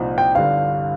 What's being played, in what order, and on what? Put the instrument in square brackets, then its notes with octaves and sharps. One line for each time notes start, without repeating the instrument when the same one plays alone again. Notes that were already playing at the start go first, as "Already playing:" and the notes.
Already playing: [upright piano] C2 A#2 F3 C4 D#4
[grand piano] G5
[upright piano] G1 G2 D3 [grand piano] F5